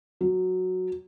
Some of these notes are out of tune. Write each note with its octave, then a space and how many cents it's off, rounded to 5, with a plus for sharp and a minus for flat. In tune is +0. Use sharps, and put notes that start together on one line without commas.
F#3 -5